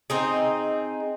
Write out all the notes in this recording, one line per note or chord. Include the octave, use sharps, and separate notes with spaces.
C4 D#4 G#4